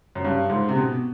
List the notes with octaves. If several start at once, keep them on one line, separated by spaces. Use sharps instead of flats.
F#2
G2
G#2
C3
B2